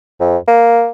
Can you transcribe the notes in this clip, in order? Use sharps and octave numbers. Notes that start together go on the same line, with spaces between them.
F2
A#3